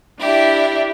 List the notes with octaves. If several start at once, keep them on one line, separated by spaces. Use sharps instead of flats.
D4 E4 G4